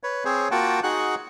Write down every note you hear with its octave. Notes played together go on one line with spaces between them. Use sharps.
B4 C#5
C4 G#4 C5 C#5
A#3 F4 F#4 F#5 G5 A5
D#4 F#4 G#4 F#5 F#6